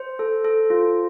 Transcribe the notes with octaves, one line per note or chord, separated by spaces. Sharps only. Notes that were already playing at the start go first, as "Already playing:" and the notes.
Already playing: C5
A4
A4
F4